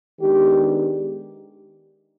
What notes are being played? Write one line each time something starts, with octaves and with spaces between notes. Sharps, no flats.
D#3 G#3 B3 D4 G4